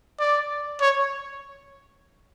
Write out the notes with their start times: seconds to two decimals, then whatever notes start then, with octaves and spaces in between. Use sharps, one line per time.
0.20 D5
0.81 C#5